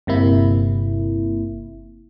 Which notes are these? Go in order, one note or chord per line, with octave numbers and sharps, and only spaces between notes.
G1 C3 A#3 E4